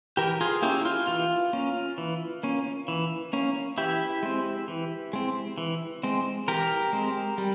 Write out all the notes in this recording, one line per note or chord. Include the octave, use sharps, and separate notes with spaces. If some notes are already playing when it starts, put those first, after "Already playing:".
E3 G4 A#4
F4 G#4
A#3 C#4 E4 G4
F4
E3 F4
A#3 C#4
E3
A#3 C#4
E3
A#3 C#4
E3 E4 G4
G#3 C4
E3
G#3 C4
E3
G#3 C4
E3 G4 A#4
G#3 C4
G3